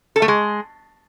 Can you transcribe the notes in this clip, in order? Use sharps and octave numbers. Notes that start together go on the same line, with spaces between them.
A4
A3
G#3